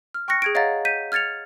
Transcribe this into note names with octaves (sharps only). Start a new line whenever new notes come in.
F6
G5 C#6 F6 F#6 A#6 C#7
G#4 G#6 D7
C#5 D#5 F5 F#5 A#5 A6
G6 B6 D#7
F6 G#6 A6 C#7 F7